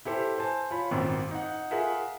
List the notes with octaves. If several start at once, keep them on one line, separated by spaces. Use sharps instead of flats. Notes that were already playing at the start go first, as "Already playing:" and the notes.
E4 G4 A4 C5
C5 G#5 A5
F4 C#5 B5
G#1 F#2 A#2 A#3 C4
D#4 F#5
F4 G#4 A#4 E5 F#5 G#5